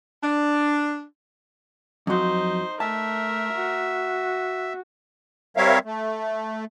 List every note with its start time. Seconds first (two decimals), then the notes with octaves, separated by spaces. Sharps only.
0.24 D4
2.07 F2 F#3 D#4 C5
2.80 A3 A#4 E5 A5
3.53 F#4
5.57 G3 C4 A#4 C#5 E5 F5
5.84 A3